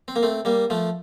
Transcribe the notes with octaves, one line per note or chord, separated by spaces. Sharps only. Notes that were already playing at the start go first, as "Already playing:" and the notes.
C4
A#3
A3 C4
G3 A#3
F3 A3